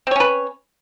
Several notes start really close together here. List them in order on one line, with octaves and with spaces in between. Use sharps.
C4 C#5 C#4 B4